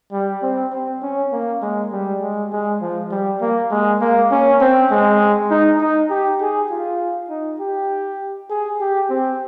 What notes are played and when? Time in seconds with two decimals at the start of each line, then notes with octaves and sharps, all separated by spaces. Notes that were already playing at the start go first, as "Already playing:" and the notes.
0.12 G3
0.43 C4
0.72 C4
1.02 C#4
1.33 A#3
1.62 G#3
1.93 G3
2.22 G#3
2.52 G#3
2.81 F3
3.11 G3
3.42 A#3
3.71 G#3
4.01 A#3
4.32 C#4
4.61 C4
4.91 G#3
5.51 D#4
5.81 D#4
6.10 G4
6.41 G#4
6.71 F4
7.30 D#4
7.60 G4
8.50 G#4
8.80 G4
9.10 C4